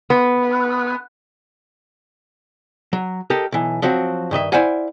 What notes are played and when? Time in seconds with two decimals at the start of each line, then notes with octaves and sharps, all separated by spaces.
0.10 B3
2.93 F#3
3.30 G4 A4 A#4 D#5
3.52 B1 E3
3.82 F3 F#3 C4 F#4
4.31 G2 D#3 D#5 E5
4.52 E4 C5 D5 F5 F#5 G#5